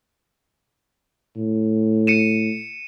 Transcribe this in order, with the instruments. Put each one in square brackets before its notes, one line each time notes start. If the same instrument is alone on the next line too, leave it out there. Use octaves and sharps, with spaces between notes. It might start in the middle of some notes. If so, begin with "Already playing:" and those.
[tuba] A2
[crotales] C#7 D#7 E7